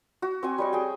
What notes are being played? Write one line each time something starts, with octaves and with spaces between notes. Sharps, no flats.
F#4
C4 F#4 G#5
G3 C#5 D#5
G#4 G5